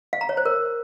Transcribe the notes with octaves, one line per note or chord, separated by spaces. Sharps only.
F5
A#5
C#5
C5
A#4